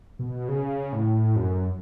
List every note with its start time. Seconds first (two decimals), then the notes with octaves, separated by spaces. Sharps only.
0.19 B2
0.49 C#3
0.93 A2
1.36 F#2